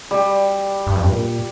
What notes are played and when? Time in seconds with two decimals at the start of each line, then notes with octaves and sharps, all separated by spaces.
0.11 G3
0.87 G2
0.96 F2
1.04 G2
1.12 A#2